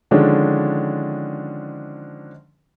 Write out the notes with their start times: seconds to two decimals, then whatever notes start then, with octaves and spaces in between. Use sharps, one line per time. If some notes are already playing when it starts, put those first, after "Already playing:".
0.11 D3 D#3 F3 G#3 C#4 D4